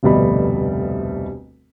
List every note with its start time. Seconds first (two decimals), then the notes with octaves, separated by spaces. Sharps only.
0.03 F1 D2 B2 G3 D#5 B5